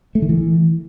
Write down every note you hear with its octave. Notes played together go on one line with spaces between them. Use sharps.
A3
D#3
E3